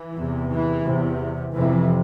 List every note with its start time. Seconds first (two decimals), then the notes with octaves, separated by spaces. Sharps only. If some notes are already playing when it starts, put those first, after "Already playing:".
Already playing: E3
0.16 E2 C3
0.50 E3
0.85 E2 C3
1.53 F2 C3 E3